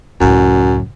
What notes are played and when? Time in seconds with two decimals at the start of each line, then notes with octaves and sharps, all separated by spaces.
0.21 C#2 F#2 A2